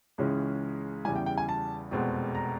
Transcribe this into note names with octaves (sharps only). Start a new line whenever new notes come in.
C#2 C#3 E3 G#3 C#4
E2 C#3 E3 G3 G#5
G5
G5
G#5
A5
F1 E2 B2 G#3 C4
A#5